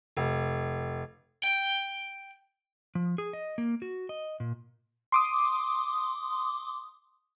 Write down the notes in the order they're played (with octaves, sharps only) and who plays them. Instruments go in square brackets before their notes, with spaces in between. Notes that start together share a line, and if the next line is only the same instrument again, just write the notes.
[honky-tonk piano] F1
[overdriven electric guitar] G5
[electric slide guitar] F3
G#4
D#5
A#3
F#4
D#5
A#2
[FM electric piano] C6 D6 D#6